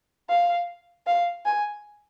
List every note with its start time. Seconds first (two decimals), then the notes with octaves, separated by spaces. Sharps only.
0.29 F5
1.07 F5
1.46 G#5